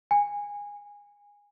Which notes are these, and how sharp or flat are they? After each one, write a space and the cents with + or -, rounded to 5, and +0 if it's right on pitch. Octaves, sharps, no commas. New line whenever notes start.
G#5 -20